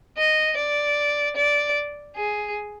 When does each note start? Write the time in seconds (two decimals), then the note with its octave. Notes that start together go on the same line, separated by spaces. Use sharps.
0.17 D#5
0.57 D5
1.36 D5
2.16 G#4